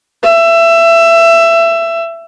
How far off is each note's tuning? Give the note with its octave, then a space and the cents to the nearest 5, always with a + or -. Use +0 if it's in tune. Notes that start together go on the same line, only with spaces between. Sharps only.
E5 +20